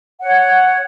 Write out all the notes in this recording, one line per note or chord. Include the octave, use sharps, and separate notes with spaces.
C#5 F#5